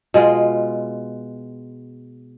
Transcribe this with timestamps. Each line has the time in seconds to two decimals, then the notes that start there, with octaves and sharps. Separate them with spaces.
0.14 B2 G#3 F4